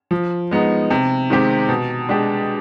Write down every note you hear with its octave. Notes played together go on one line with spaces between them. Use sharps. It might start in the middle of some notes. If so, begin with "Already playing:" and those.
F3
G#3 B3 D#4
C3
D#3 G#3 C4 G4
B2
G#3 D4 G4